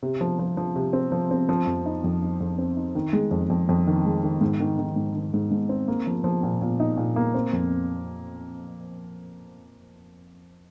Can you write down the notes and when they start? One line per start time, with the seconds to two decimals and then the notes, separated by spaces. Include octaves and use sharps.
0.03 C3
0.21 F3
0.39 F3
0.57 F3
0.76 C3
0.93 C4
1.12 F3
1.31 C4
1.49 F3
1.67 F2
1.86 D#4
2.04 F2
2.22 D#4
2.41 F2
2.58 C4
2.76 D#4
2.95 D#3
3.13 G#3
3.31 F2
3.50 F2
3.69 F2
3.87 D#3
4.05 G#3
4.24 D#3
4.41 G#2
4.60 D#3
4.79 D#3
4.96 G#2
5.15 D#3
5.34 G#2
5.51 G#2
5.69 C4
5.88 A#3
6.07 F3
6.24 F3
6.43 A#2
6.61 A#2
6.80 D#4
6.97 A#2
7.16 A#3
7.34 C4
7.53 F2